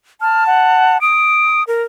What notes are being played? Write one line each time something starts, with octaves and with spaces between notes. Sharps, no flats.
A5 F6
F#5
D#6 D7
A#4